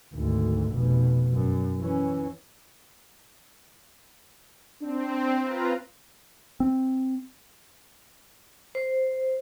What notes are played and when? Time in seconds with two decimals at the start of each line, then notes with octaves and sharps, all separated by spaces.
0.14 G#1 D2
0.74 F1 B2
1.33 F#2
1.81 E3 C#4
4.82 C4 D4
5.43 F4 B4 A#5
6.60 C4
8.75 C5